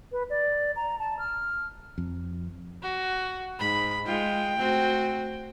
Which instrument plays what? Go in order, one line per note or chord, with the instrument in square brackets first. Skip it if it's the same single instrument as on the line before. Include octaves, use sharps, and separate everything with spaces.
[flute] B4
D5
A#5
A5
F6
[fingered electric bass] F2
[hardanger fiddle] F#4
[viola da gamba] G#2 [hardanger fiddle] B5
[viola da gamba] G#3 F4 [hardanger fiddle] G5
[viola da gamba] A3 C4 F#4